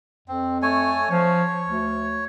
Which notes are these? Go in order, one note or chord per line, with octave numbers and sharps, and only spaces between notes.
F2 C4
A3 C#5 G#5
F3 C#5
D2